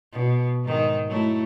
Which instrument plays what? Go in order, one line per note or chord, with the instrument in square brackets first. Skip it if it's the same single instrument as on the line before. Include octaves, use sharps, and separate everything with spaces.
[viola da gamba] B2
G#2 D#3
F#3 A3 E4